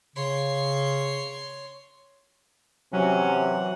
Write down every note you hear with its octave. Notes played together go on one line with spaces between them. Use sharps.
C#3 C#5 C6
C3 E3 F#3 C#4 F#5